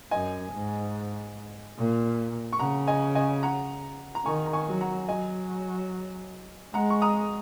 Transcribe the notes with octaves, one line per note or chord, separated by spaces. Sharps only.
F#2 D#5 G#5
G#2
A#2
C#6
C#3 F#5 A#5
D#5 G#5
D#5 G#5
F#5 A#5
A#5
D#3 G#5 C#6
A#5
G#5 C#6
F#3
F#5 A#5
F#3 D#5 G#5
G#3 F#5 A#5
C#6
A#5 D#6